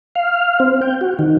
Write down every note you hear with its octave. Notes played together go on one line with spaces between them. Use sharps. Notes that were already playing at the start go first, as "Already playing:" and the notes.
F5
C4
G5
F#4
D#3